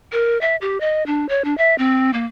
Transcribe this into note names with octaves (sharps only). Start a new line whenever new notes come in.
A#4
E5
G4
D#5
D4
C#5
D4
E5
C4
A#3